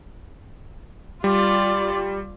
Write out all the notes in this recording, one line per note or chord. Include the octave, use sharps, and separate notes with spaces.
G3 F4 D5